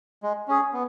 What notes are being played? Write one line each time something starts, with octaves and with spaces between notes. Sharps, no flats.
G#3
C#4 G#4
B3